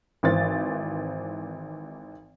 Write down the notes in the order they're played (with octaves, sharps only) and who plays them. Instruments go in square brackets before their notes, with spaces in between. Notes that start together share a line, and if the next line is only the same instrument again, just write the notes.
[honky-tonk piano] G#1 E3 C5 A6